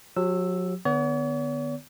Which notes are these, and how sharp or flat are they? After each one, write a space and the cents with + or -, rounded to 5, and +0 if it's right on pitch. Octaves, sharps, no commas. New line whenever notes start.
F#3 -35 G4 +0 E6 +0
D3 +40 B3 +0 C#5 +45